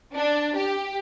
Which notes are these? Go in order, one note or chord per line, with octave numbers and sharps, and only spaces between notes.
D4
G4